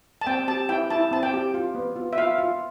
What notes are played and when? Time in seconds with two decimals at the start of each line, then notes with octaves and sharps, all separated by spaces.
0.21 A5
0.27 C4 G5
0.48 G4 A5
0.69 E4 G5
0.90 E4 A5
1.11 C4 A5
1.23 G5
1.33 G4
1.54 F4
1.75 B3
1.96 F4
2.13 E5
2.18 F4 F5
2.38 F4